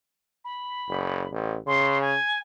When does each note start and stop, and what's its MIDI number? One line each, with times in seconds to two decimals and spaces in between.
0.45 1.29 83
0.89 1.26 30
1.32 1.57 33
1.67 2.15 49
1.67 2.00 84
2.01 2.39 80